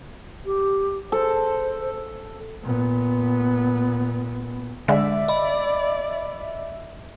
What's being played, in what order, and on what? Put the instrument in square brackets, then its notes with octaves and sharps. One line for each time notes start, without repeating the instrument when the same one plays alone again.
[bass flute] G4
[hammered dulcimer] A4 [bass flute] C5
[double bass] A#2 B3
[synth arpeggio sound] D3 G#3 [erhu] D5 [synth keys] E5
[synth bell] D#5 B5